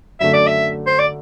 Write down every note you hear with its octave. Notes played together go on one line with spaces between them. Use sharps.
F#2 D3 A3 E5
D5
E5
C5
D5